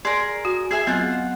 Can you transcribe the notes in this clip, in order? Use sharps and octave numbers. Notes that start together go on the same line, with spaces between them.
G#4 A#4 D5 C6
F#4
G#4 E5 G#5
F#3 B3 C4 F4 F#5